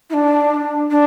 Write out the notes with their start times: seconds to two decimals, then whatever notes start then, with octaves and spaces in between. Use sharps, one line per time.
0.10 E4
0.13 D4
0.91 D4